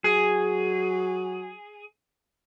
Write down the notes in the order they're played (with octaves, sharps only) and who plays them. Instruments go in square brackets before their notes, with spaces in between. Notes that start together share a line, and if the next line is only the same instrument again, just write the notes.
[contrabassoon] F#3 [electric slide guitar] G#4